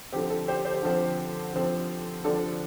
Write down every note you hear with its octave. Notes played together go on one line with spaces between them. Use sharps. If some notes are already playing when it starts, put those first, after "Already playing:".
D3 F3 C4 G4
A4
G4 C5
G4 C5
D3 F3 C4
D3 F3 C4
D3 F3 C4 A4 D5